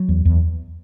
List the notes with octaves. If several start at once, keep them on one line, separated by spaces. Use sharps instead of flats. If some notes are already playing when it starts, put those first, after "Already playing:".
Already playing: F#3
E2
E2